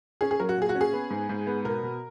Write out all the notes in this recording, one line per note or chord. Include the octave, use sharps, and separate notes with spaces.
C#4 G#4
G#4
F#3 A#4
F#4
A#2 G#4
F#4
C#4
G#4
B3
G#2
G#2
B3
B2 A#4
B2